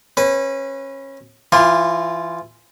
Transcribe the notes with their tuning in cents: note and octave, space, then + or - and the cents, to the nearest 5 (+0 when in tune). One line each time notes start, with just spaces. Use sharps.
C#4 -25 B4 +0
E3 +20 F4 +0 G#5 -45